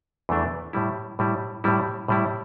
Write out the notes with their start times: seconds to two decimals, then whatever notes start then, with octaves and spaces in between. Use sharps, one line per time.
0.29 E2 E3 A3 D4
0.73 A2 G3 E4
1.19 A2 G3 E4
1.64 A2 G3 E4
2.08 A2 G3 E4